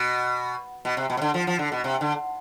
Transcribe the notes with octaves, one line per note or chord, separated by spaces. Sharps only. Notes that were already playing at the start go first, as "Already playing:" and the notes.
Already playing: B2
B2
C3
B2
C3
D3
F3
F3
D3
B2
C3
D3